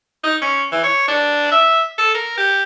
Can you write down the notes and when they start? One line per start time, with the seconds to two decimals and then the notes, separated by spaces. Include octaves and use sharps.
0.24 D#4
0.42 C#4
0.72 E3
0.83 C#5
1.08 D4
1.51 E5
1.98 A4
2.15 A#4
2.38 G4